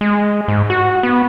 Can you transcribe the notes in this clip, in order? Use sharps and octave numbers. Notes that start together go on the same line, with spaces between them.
G#3
G#2
F#4
B3